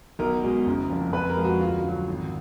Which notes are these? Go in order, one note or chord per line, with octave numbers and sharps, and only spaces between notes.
B1 A#4
B2 G#3
F#1
F2 F3
F2 B4
A#4
F3 G#3
F#4
D2 F4
D3 F#3
G#1